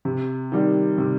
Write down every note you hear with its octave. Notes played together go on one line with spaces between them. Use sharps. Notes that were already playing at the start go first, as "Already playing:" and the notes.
C3
D#3 G3
C3